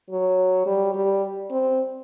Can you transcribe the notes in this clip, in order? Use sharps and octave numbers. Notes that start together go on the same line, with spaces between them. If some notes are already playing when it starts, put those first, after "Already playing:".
F#3
G3
G3
C4